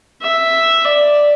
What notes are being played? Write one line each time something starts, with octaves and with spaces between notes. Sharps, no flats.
E5
D5